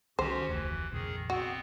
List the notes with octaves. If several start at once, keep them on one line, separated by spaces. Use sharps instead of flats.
C2 D#3 C#4 F#4 G4 C5
F1 D2 E3
A#1 F2 C3 D#3 G#4
B3 C4 F#4